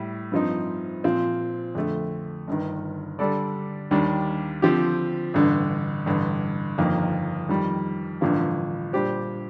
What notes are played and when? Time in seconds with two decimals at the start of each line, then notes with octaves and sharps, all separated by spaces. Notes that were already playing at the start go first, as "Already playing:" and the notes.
Already playing: A2 G3
0.32 G2 F3 C4 D#4
1.04 A#2 F3 C4 F4
1.75 F2 D3 A3
2.48 G1 G2 D#3
3.19 D3 G3 D4 A4 D5
3.91 D#2 D#3 G3 D4
4.62 D3 F3 C4 G4
5.34 A1 G2 D3
6.06 A1 G2 D3
6.78 G1 F2 D#3 A#3
7.49 F2 D#3 G3
8.21 A1 G2 D3 F3 A#3
8.93 A#2 G3 D4 G4 C5